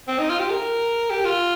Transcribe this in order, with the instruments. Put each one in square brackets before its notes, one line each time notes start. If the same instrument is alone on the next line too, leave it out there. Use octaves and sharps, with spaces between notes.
[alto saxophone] C4
D#4
F4
G4
A#4
G4
F4